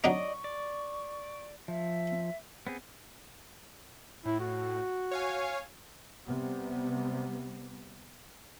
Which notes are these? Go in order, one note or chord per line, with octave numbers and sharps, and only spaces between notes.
F#3 D4 D#4 D5 D#5 C#6
D5
F3 E5
B3 C4 G#4
A2 E4
F#4
C#5 F5 G#5
C3 G3 B3